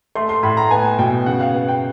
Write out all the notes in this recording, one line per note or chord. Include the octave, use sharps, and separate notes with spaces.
A3 C6
C6
A2 B5
A#5
B3 G#5
B2 G5
C#3 F#5
F5
B3
G5